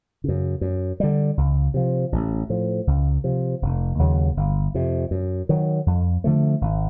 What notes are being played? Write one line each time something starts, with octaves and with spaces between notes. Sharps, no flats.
F#2 C#3
F#2
D3 G3
C#2
C3 F3
A1
A2 F3
C#2
C3 F3
F1
D#2 C#3 F#3
G1
F2 C3
F#2
D#3 F#3
F2
D3 F3 A3
G#1